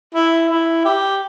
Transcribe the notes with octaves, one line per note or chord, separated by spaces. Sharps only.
E4
E4
G4